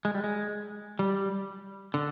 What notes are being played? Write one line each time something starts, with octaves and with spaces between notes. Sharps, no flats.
G#3
G3
G#3
G3
D3